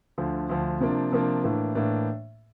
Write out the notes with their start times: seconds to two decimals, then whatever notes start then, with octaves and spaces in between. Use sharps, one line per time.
0.18 D2 D3 F3
0.49 D2 D3 F3
0.80 C3 F3 A#3 D4
1.12 C3 F3 A#3 D4
1.44 A2 E3 A#3 D4
1.75 A2 E3 A#3 D4